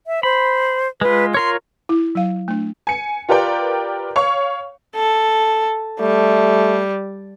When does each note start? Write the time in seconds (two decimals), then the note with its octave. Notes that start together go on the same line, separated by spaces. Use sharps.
0.07 E5
0.23 C5 B5
1.01 G#3 F4 B4
1.34 F4 A#4 C#5 C6
1.89 E4
2.15 F#3 F5
2.48 A3 D4
2.87 G#5 C#7
3.29 F4 G4 A#4 B4 D5 G5
4.16 C#5 F5 C#6
4.96 A4
6.00 G3 A3